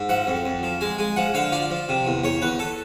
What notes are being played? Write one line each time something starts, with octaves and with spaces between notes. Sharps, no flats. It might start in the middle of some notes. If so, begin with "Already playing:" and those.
Already playing: G#2
F3 F#5
F2
F2
F3
G#3 G#5
G#3 G#5
F3 F#5
D3 F5
F3 D5
F3
C3
E2
E2 C#5
E2 B4
A4